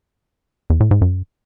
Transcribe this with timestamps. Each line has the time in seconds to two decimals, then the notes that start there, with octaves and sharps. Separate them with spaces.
0.70 E2
0.80 A2
0.91 G#2
1.01 F#2